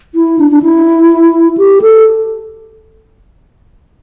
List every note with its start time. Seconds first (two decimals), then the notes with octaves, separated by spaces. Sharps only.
0.15 E4
0.39 D4
0.51 D4
0.63 E4
1.58 G4
1.82 A4